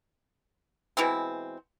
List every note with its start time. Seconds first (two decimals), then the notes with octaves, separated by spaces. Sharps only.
0.97 B2 E3 G#3 C4